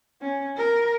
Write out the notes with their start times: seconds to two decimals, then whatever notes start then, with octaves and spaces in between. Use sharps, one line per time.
0.21 C#4
0.57 A#4